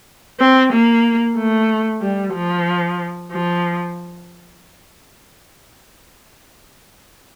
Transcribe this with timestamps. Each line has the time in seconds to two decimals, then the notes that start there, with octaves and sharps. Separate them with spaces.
0.40 C4
0.73 A#3
1.37 A3
2.01 G3
2.34 F3
3.31 F3